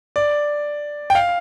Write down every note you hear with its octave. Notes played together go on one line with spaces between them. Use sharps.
D5
G5
F5